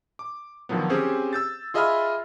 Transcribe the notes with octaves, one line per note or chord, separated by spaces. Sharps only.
D6
D3 D#3 F3 F#3 B3
C4 C#4 G4 G#4 C5
E6 G6 A6
F4 G#4 D#5 E5 B5 F6